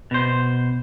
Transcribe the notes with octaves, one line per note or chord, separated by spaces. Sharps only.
B2 C5